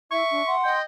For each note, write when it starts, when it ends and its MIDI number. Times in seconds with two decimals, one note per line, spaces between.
0.11 0.23 64
0.11 0.55 76
0.11 0.55 85
0.31 0.42 62
0.47 0.71 78
0.47 0.79 84
0.64 0.83 75
0.64 0.81 79